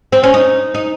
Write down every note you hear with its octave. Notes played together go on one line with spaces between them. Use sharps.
C4
C#4
D#4
D#4